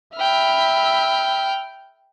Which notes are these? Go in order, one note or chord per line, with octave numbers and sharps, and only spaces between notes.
E5 G5 B5 F6